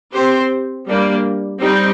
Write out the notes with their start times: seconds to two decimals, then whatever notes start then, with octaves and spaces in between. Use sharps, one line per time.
0.14 C4 G4 C5
0.87 G3 A#3 D4
1.61 G3 C4 D#4 G4